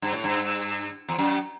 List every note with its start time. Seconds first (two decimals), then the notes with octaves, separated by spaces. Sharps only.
0.02 G2
0.12 A2
0.24 G2
1.08 E2
1.18 F#2